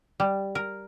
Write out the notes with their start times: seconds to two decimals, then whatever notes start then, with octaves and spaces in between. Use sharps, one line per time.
0.20 G3
0.55 A#4